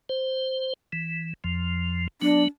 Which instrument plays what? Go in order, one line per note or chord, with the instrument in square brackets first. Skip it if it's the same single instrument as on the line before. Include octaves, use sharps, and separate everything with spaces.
[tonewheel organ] C5
E3
F2 F3
[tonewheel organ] F#3 B3 [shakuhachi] D4